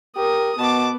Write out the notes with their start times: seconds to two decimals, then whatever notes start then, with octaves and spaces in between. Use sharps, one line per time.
0.16 G4 A#4 D#6
0.58 B2 B3 A5 D6